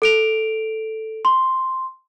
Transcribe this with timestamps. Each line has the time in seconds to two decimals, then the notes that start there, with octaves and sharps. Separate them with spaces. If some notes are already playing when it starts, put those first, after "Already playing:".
0.02 A4 D7 F7
1.25 C6